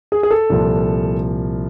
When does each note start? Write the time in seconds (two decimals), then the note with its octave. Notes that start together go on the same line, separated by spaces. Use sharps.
0.12 G#4
0.23 G#4
0.31 A4
0.50 C2 A#2 F3